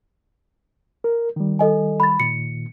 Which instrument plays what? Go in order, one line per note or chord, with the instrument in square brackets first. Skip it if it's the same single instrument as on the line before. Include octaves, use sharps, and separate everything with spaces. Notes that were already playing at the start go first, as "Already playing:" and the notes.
[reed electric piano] A#4
D#3 G3
[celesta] A4 D#5 G#5
B5 A6
[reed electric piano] A#2 D#3 [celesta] C#7